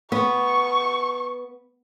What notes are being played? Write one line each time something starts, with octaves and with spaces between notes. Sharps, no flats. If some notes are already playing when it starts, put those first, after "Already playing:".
B3 C#6